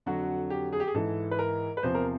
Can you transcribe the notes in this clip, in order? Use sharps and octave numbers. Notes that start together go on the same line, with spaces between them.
F2 D3 F#3 F#4
G4
G#4
G4
G#4
G#2 E3 A4
B4
A#4
B4
E2 C3 F3 C5
A#4